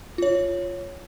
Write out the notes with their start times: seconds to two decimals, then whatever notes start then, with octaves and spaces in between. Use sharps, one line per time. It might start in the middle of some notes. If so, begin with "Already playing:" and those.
0.18 F4 C#5